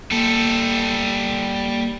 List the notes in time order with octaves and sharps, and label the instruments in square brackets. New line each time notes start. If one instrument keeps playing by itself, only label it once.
[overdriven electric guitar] G3 A4 [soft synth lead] A#3